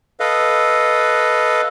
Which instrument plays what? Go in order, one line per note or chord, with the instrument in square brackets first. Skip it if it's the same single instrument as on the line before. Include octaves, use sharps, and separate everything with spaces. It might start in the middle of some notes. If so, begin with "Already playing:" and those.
[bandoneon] A4 B4 D#5 F5